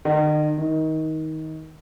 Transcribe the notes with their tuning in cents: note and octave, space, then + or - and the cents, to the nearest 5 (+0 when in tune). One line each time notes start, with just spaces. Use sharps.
D#3 -40
D#3 +20